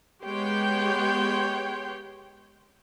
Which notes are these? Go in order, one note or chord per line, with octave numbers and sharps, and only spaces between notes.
G#3 B3 G4 C#5 G5 C6